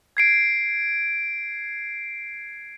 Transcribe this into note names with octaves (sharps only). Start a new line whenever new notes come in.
G#6 C7 D7